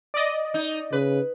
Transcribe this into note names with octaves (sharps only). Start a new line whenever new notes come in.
D5 D#5
D#4
C#3 B4